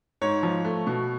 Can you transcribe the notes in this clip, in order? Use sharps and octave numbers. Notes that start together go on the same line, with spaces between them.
G#2 C#5
F3
A3
B2